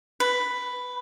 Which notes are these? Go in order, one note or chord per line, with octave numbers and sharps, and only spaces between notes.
B4